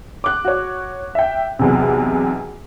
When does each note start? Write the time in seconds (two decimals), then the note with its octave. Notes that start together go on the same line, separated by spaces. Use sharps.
0.24 D6 F#6
0.45 F#4 C#5
1.15 E5 G5
1.59 B1 E2 C3